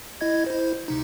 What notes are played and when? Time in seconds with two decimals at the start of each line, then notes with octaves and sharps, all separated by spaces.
0.21 E4 D#5 G#6
0.46 E4 C5
0.88 C#2 C3 D#4